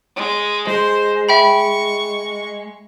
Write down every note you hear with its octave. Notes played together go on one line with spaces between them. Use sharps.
G#3
G#3 C5
E5 G5 B5 C#6